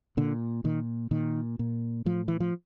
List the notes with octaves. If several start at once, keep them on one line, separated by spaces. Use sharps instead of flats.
A#2 D3
A#2 D#3
A#2 D#3
A#2
A2 F3
E3
F3